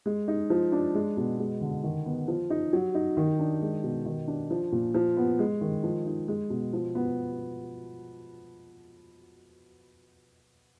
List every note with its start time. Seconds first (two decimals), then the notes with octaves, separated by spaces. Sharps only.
0.06 G#3
0.28 D#4
0.50 F3
0.72 D4
0.95 G#3
1.17 B2
1.39 G#3
1.61 D3
1.84 D#3
2.06 B3
2.28 F3
2.50 D#4
2.73 F#3
2.95 D#4
3.17 D#3
3.39 D4
3.62 G#3
3.83 B2
4.06 D#3
4.28 D4
4.51 F3
4.72 A#2
4.94 F3
5.17 B3
5.39 G#3
5.61 D#3
5.83 F3
6.07 D#4
6.28 G#3
6.50 B2
6.73 F3
6.95 B3